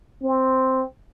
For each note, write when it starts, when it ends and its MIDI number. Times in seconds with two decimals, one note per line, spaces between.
0.22 0.82 60